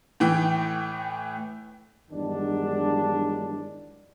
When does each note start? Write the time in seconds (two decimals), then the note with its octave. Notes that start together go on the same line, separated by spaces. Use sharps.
0.20 A2 E3 G5
2.11 E2 G2 D#3 F#3 G#3 D4